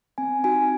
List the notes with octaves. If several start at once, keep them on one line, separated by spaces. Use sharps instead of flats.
C4 G#5
D#4 F#4 G#5